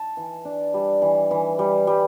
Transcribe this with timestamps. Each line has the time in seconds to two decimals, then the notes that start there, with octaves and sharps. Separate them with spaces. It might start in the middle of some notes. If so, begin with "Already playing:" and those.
Already playing: A5
0.17 E3
0.45 D4
0.74 G3
1.02 E3
1.31 E3
1.59 G3
1.87 G3